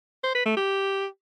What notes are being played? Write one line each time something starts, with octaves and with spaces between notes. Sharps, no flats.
C5
B4
A3
G4